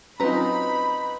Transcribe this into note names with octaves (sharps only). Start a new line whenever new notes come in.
F#3 C4 C#4 D#4 F4 B4 A#5 B5